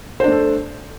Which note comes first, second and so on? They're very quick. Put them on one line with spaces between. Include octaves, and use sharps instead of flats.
C5 D4 A3 A4